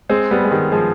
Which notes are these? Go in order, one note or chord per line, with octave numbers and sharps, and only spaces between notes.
G#3 C4
G3 B3
G#3
D#3 G3
F3 G#3